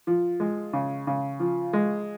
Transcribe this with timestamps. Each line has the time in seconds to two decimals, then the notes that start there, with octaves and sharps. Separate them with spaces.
0.07 F3
0.40 G#3
0.73 C#3
1.07 C#3
1.40 F3
1.73 G#3